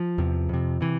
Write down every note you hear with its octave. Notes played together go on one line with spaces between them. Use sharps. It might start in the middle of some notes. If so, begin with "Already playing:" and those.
Already playing: F3
E2 C3
F2 C3
C3 E3